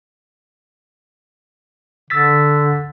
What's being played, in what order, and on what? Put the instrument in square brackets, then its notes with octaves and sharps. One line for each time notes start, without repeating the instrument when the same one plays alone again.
[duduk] D3 [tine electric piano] E6 A6 B6